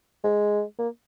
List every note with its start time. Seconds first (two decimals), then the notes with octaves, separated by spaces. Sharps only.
0.24 G#3
0.79 A#3